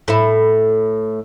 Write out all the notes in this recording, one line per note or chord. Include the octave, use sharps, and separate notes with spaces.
A2 E4